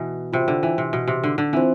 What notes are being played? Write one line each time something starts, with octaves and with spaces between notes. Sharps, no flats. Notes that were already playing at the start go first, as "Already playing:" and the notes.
Already playing: B2 E3
C3 F4 C5 G5
D3
E3
C3
B2
C3
D3
D3
E3 C4 F4 C5